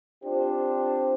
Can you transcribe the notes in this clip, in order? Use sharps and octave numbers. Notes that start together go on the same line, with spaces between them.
C4 D4 F4 G4 C5